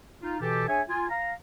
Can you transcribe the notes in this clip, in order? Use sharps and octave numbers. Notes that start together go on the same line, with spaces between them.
D#4 F4
B2 E3 G4 A4
D4 G#4 C#5 E5 G#5
F4 G#5
F5 A#5